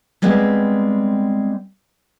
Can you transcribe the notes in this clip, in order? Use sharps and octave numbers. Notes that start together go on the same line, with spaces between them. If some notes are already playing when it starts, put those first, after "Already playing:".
G3 G#3 B3 C4 G#4